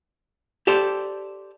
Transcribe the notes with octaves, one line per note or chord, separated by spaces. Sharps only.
G4 A4 C5 D5